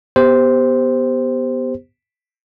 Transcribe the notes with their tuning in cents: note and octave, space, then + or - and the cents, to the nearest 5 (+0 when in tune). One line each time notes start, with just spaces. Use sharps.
B3 +0 G4 +10 C5 -5